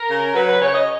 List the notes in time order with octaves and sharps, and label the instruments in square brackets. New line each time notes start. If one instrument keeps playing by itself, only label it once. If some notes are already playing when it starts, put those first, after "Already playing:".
Already playing: [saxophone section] A#4
C#3
F#3 B4
B4
C#3 C#5
D#5